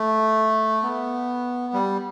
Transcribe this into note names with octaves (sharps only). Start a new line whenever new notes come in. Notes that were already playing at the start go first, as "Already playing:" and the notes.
Already playing: A3
B3
G3